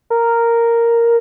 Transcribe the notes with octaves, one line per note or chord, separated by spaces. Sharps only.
A#4